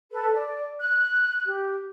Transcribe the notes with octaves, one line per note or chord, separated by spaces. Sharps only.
A4 B4
D5
F#6
G4